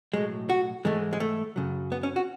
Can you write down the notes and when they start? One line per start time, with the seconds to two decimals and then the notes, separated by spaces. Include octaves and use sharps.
0.14 B1 A2 F#3 G#3
0.50 F#4
0.85 G#2 E3 G#3 A3
1.13 G#3
1.20 A3
1.56 F#2 C#3 F#3
1.92 B3
2.03 C#4
2.16 F#4